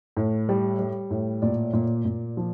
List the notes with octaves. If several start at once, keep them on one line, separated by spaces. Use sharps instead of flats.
A2
G3
G3
A2
A#2 D5
A#2
A#2
F3